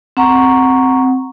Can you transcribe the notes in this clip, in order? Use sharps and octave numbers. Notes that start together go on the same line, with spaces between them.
C4 F#5 A#5 C#6